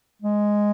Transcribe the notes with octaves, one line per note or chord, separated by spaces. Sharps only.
G#3